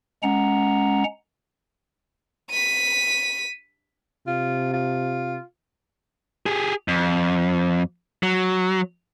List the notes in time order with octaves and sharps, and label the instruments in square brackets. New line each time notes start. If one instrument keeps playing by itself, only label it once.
[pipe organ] G#3 C#4 F#5 A#5
[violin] B6 D#7
[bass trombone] C3 [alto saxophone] F4
[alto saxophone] F4
[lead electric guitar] G4 G#4
F2
F#3